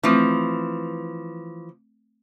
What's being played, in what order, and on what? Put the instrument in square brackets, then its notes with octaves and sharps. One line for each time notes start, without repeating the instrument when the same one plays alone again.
[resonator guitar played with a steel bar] E3 F3 [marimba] A3 C4